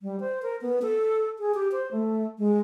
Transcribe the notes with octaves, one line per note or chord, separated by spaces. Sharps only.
G3
C5
A#4
B3
A4
G#4
G4
C5
A3
G#3